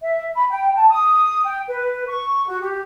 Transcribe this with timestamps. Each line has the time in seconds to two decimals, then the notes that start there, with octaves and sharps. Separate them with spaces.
0.02 E5
0.35 B5
0.50 G5
0.75 A5
0.90 D#6
1.44 G5
1.68 B4
2.08 C#6
2.46 F#4
2.61 G4